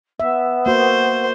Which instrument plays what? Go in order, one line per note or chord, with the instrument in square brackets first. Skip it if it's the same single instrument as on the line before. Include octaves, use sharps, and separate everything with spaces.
[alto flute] B3 [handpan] E5
[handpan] A#3 F#4 [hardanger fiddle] C5